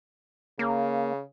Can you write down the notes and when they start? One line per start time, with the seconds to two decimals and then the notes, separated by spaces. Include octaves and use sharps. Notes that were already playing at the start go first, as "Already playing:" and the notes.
0.59 C#3 A#3